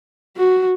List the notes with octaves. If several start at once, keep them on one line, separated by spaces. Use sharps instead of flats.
F#4